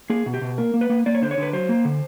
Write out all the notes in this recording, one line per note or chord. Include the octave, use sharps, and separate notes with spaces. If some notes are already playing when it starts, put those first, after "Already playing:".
A#3 G#4
B2
G4
B2
A#3 A#4
A#3
B4
A#3
A#3 D5
C#5
D3 C5
C#5
D3 B4
F#3 C5
A#3
D3